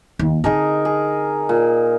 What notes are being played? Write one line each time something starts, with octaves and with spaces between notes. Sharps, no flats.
D#2 A#3
D3 C4 D#4 G#4 A#4
G#4
A#2